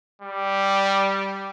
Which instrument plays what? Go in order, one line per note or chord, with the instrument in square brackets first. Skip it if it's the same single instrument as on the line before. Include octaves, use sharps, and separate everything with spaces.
[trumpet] G3